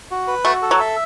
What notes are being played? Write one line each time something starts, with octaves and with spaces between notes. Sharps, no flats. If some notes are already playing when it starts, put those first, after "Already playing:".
F#4
B4
A3 F#4
A4
F#3
E5